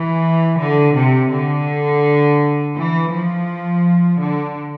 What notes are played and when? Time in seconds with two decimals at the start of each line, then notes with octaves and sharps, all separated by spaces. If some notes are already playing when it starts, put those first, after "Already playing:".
Already playing: E3
0.58 D3
0.95 C3
1.30 D3
2.75 E3
3.11 F3
4.20 D3